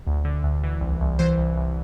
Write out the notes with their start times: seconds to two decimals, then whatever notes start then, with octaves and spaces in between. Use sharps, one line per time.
0.07 D2
0.25 D3
0.43 D2
0.63 E3
0.81 C2
1.01 C2
1.19 E3 C5
1.38 C2
1.57 C2